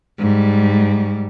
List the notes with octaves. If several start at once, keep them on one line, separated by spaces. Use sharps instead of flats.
G#2 G3